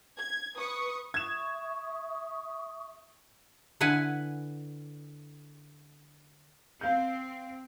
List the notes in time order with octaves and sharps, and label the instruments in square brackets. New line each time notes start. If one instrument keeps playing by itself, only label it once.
[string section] G#6
B4 C#6 D#6
[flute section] E5 C#6 D#6 [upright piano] G#6 E7
[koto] D3 E4 B4 F#5 G#5
[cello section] C4 [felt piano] F5 G6